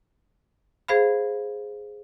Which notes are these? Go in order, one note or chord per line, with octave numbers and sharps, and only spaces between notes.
G#4 C5 F5 B5